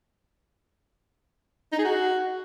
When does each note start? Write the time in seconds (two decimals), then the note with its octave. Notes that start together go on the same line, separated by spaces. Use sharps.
1.72 D#4
1.78 G#4
1.84 F#4